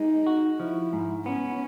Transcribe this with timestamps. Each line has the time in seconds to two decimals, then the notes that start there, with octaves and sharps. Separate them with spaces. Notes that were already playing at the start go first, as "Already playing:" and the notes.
Already playing: G#3 D#4
0.26 F#4
0.60 F3 E4
0.93 G#2
1.26 B3 C#4